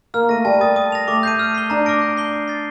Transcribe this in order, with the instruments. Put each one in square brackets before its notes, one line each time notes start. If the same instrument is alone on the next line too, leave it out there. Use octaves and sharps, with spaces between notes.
[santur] A#3 [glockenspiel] F6
[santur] A3 [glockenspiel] A#6 D#7
[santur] G3 [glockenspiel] A5
[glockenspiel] D#6 A6
D#6
A#6 F7
[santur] A3 [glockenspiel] D6
[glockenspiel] G6 C7 D#7
F6
C7 G7
[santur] D4 [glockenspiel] A#5
[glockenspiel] D6 F6 A#6 D7
G6
C7 G7
D6
A6 C7